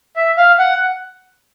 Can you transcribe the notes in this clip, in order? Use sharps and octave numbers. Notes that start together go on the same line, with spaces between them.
E5
F5
F#5